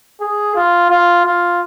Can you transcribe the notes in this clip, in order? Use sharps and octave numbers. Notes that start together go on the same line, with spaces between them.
G#4
F4
F4
F4